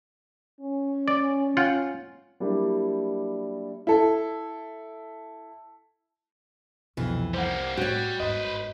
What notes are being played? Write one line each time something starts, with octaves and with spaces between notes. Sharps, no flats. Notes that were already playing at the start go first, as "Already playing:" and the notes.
C#4
D5
F4 F#5 G5
F#3 G3 A#3 D4 E4 G4
E4 A4
C2 F2 B2 E3
G3 A#3 C5 F#5
A2 G3 F#4 C#5
G1 G#2 B4 C5 D#5